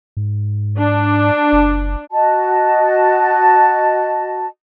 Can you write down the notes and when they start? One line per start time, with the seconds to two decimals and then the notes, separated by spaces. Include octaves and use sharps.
0.17 G#2
0.79 D4
1.53 F#1
2.11 F#4 D#5 A5